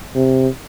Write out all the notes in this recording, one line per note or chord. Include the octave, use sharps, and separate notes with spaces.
C3